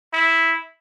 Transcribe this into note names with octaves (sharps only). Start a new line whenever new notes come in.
E4